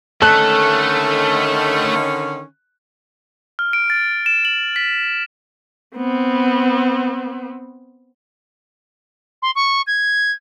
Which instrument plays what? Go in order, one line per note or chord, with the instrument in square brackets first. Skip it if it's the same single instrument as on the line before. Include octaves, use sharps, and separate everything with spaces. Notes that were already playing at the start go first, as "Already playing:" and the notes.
[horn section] D3 D#3 C#4 [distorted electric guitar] A3 [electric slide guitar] A4 [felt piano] F#6
[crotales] F6
D7
A6
E7
F#7
B6
[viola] B3 C4
[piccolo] C6
C#6
G#6